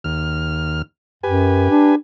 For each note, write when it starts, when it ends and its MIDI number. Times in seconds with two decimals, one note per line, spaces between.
0.04 0.82 39
0.04 0.82 89
1.23 1.68 42
1.23 1.95 67
1.23 1.95 71
1.23 1.95 80
1.70 1.95 62